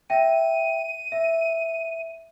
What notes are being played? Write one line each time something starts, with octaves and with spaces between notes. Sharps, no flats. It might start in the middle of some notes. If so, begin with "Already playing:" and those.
E5 G5 D#7
E5